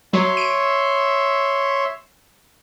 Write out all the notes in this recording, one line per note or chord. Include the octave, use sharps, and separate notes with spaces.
F#3 C#5 E5 C6
D7 D#7